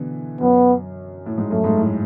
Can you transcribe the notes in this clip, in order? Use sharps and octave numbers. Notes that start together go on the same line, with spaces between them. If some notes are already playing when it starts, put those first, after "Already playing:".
Already playing: B2 D3 E3
F#2 B3
A2
G#2
F#2 A3
G#2
A2